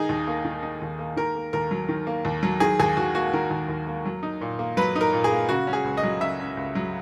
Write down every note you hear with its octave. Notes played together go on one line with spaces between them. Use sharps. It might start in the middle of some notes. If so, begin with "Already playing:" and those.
Already playing: D#3 D#4 G#4
D#2
A#3
D#3
D#4
D#2
A#3
D#3 A#4
A#3
D#2 A#4
F#3
D#3
A#3
D#2
F#3
D#3 G#4
D#2 G#4
D#2 F#4
A#3 F#4
D#3 A#4
D#2
D#2
A#3
F#3
D#4
A#2
A#3
F#3 B4
D#4
A#4
A#2
G#4
A#3
C#3 F#4
C#4
G#4
C#2
D#5
F#3
C#3 E5
C#4
C#2
F#3